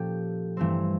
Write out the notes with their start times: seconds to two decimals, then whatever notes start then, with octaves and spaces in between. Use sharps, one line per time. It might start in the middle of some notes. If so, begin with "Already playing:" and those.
Already playing: A#2 F3 A#3 C#4 G4 A4
0.57 G2 E3 A3 C4